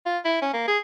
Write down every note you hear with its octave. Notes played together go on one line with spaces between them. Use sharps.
F4
E4
C#4
A#3
G#4